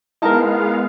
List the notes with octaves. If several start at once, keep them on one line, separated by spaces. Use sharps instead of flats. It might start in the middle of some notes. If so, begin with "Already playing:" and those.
G#3 B3 D#4 E4 A#4 F5 A5